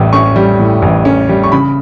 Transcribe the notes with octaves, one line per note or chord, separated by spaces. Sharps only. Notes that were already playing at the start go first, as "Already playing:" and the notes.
Already playing: A1 A2 G3
C#4 C#6
G3
A2
A1
C#4
G3
C#6
C#3 B5